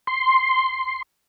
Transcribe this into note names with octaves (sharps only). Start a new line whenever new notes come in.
C6